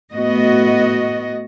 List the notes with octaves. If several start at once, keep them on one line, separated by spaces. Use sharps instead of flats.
A2 A3 B3 F#4 D#5